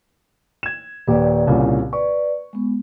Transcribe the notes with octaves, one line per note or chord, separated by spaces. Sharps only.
G#6 E7
D#1 G4 B4 D5
C2 A#2 C#3 C4 E4 G#5
B4 D5 C#6
G#3 B3